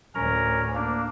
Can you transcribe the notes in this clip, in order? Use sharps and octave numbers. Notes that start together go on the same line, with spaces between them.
D2 A2 C#4 A#4 A#5
A#3 D4